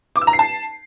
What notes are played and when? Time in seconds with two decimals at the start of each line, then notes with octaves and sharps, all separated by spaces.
0.16 D6
0.21 E6
0.27 A#5
0.33 C7
0.39 A5